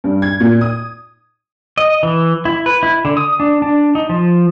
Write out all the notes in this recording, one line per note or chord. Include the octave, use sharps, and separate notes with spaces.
G2
G#6
A#2
D#6
D#5
E3
E4
B4
E4
D3
D#6
D4
D4
D#4
F3